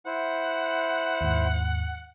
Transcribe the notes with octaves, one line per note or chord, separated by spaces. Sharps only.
E4 C5 F#5
D#2 G#2